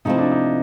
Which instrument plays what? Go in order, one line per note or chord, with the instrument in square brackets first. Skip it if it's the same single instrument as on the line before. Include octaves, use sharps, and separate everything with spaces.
[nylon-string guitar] C3 F3 A3 C4 E4 [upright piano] D#4
[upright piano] D4
D#4